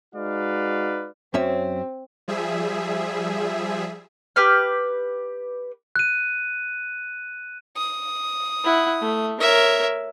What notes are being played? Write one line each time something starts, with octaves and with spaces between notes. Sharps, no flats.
G#3 D#4 F#4 B4 D5 F5
F#2 C4 C#4 E5
F3 G3 G#4 E5
G4 B4 F6
F#6 D#7
D#6
E4 F#5
A3
A#4 C#5 E5